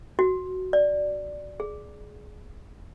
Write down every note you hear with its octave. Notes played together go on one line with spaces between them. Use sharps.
F#4
D5
G#4